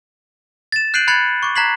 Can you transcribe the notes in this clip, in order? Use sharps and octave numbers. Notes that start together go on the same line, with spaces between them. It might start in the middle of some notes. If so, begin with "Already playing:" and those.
A6 E7
F#6 G6 C7 D7 D#7 F#7
B5 F#6 G#6 A6 C#7 F#7
C#6 D6
A#5 F#6 G#6 B6 C7 F#7